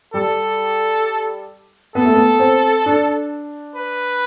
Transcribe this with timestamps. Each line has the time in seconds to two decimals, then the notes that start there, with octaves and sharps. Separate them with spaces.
0.14 G3 A4
1.95 B3 A4
2.05 A3
2.15 B3
2.40 C4
2.86 D4
3.76 B4